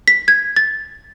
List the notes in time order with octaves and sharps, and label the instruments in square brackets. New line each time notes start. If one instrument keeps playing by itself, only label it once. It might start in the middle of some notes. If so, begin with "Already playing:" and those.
[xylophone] B6
G#6
A6